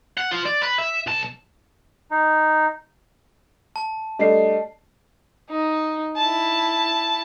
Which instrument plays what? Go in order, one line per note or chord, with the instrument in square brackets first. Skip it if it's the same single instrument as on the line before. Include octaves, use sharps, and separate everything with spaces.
[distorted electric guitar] F#5
F4 C5
D5
B4
E5
B1 A5
[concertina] D#4
[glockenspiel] A5
[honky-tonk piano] G3 A3 D4 [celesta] D#5 C7
[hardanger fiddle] D#4
E4 A5